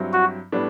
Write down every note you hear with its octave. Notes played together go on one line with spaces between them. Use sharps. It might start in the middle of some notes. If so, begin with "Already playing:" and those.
Already playing: G2 F#3 C4 E4
F#4
A2 G3 B3 D4